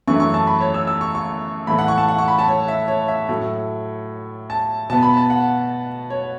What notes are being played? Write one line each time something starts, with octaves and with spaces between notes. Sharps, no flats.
F#2 E3 A3 C#6
C#6
A5
B5
C#5
E6
E6
C#6
C#6
A2 E3 A3 B5
F#5
C#6
A5
F#5
C#6
B5
A5
C#5
E5
C#5
E5
A2 F#3 A3
A5
B2 B3 A5
B5
A5
F#5
C#5